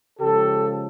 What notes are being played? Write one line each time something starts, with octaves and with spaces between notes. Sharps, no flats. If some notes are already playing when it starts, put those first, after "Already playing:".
C#3 F3 G#3 G4 A4